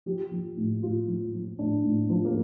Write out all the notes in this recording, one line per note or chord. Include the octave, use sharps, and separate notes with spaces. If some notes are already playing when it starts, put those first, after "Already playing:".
F3 G4
F3
A2
A2 F4
F3
F3
A2 D4
A2
F3
A#3